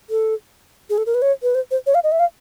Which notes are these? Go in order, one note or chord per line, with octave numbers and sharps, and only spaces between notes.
A4
G#4
A4
A#4
B4
C#5
B4
C5
C5
C#5
F5
D#5
E5
F5